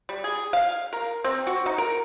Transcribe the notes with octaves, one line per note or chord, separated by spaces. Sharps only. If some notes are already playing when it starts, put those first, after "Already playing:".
G3
G#4
F5
A#4
C4
F#4
D#4
A#4